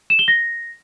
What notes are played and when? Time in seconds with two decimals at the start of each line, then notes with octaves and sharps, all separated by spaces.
0.10 E7
0.19 G7
0.28 A#6